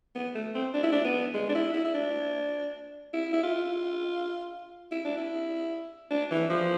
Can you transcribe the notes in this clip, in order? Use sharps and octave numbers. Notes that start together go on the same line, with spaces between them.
B3
A3
C4
D4
E4
D4
B3
G#3
D4
E4
E4
E4
D4
E4
E4
F4
E4
D4
E4
D4
E3
F3